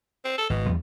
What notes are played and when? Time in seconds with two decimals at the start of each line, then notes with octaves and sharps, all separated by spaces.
0.25 C4
0.38 A4
0.50 G#1 B2
0.66 E2 G3